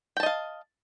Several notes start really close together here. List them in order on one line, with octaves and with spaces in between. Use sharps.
G5 A5 D#5 F5